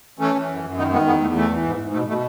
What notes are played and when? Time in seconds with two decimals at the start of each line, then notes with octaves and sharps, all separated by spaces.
0.19 E3 A3 C#4
0.35 E3
0.49 F#2
0.64 F#2
0.77 D#3 B3 D#4
0.92 D#3 G#3 B3
1.06 E2 G#3 B3
1.21 E2 A3
1.35 E3 A3
1.50 E3
1.64 G#2
1.79 G#2
1.93 B2 A3
2.07 B2 A3